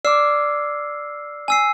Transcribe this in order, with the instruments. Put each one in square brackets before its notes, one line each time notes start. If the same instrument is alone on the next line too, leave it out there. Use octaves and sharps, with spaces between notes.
[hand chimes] D5 D6 [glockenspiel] E6 F6 C7
[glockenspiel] G#5 E6 C7